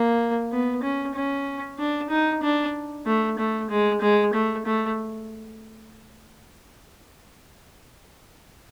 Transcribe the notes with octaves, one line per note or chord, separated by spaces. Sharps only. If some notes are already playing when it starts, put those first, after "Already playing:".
Already playing: A#3
B3
C#4
C#4
D4
D#4
D4
A3
A3
G#3
G#3
A3
A3